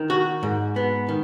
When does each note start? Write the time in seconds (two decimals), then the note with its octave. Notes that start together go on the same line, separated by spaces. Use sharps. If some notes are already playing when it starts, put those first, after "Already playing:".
Already playing: D#3
0.10 F#4
0.43 G#2
0.76 B3
1.09 D#3